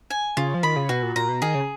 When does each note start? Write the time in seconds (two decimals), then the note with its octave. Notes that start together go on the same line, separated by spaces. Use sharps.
0.10 G#5
0.37 C#3 F4
0.54 F3
0.63 D#3 B5
0.76 C#3
0.89 B2 F#4
1.03 A#2
1.16 A#2 A#5
1.29 B2
1.42 D#3 G#4
1.55 C#3